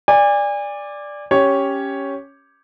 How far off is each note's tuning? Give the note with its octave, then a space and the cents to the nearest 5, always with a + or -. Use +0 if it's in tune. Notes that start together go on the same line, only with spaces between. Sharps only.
D5 +0 G#5 -35
C#4 +0 G4 +0 C#5 +0